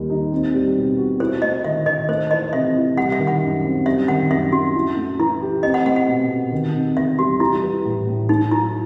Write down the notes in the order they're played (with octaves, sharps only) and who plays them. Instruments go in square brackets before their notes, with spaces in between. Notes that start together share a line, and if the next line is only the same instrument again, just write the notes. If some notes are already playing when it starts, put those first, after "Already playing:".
Already playing: [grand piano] D#2 D#3 G3
D#4
C4
G3
B2
F#4
[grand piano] E4 [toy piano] C5
[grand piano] A3 [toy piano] D#5
[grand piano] D#3 [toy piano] E5
[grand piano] D#3 [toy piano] D#5
[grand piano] A3 [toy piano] C5
[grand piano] E3 [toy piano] D#5
[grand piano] C3 [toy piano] E5
[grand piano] E4
[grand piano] G3 [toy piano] F#5
[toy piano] E5
[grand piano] D#3
[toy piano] F#5
[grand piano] F#2
C4
[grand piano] G3 [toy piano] E5
[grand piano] D#3 [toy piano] F#5
[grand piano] F#2 [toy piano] E5
[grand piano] F#2 [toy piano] F#4
[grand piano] E4
A3
[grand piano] E3 [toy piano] E4
[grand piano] G4
[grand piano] C4 [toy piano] D#5
[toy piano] F#5
[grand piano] A3 [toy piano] F#5
[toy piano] F#5
[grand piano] B2
B2
D#3
C3
[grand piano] E2 [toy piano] E5
[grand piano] G3 [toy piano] F#4
[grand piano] G3 [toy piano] E4
[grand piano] E3
A2
A2
[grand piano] A3 [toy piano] D#4
[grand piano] F#3 [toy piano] E4